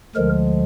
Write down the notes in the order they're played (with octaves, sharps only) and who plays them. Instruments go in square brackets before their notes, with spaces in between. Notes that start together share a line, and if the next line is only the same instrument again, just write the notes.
[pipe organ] D2 D3 F3 G#3 A#4